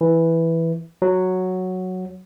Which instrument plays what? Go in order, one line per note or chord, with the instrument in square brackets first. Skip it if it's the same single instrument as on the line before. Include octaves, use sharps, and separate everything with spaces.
[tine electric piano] E3
F#3